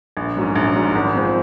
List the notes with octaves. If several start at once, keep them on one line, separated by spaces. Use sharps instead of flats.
A#1
G#2 F#3 C#4
A#1
G#2 F#3 C#4
G#1
F3 G#3 C4